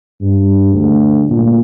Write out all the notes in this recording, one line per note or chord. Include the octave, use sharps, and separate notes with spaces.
G2
D2
A#2